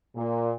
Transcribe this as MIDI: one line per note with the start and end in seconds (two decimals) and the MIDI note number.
0.15 0.53 46